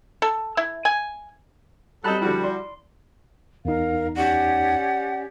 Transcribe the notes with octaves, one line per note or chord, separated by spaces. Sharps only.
A4
E4
G#5
F#3 G3 C4 D#4 A4 A5 B5 F#6
D3 F3 G3 E4 F#4
D5 C6
E2 D#4 A#4 F5
C#4 G4 D5 F#5